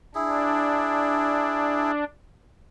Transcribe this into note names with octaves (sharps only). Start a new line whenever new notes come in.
D4 E4 G#4